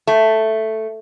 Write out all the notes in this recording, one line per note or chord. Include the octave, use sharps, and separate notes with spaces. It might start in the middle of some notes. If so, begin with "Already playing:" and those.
A3